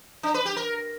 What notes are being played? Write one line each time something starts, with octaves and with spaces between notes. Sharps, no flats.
D4
B4
G4
A#4